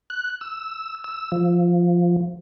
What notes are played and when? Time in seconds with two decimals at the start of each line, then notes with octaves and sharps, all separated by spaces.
0.10 F#6
0.41 E6
1.04 E6
1.32 F3